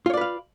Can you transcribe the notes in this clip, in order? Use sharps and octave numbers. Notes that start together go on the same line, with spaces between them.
F4 B4 C#5 D5 F5